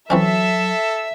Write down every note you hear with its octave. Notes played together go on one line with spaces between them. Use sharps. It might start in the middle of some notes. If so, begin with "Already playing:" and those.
E3 F#3 C4 C#4 A4 E5